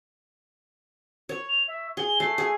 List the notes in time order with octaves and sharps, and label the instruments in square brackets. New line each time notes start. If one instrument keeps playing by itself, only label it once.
[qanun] C#5
[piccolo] F7
E5
[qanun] G#4 [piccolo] G7
[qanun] A3 [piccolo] C7
[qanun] G#4